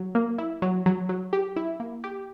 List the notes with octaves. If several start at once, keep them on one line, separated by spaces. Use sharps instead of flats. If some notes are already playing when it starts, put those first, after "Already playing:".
Already playing: F#3
A#3
E4
F#3
F#3
F#3
G4
E4
A#3
G4